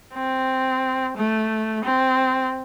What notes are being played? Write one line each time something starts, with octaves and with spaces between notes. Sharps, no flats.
C4
A3
C4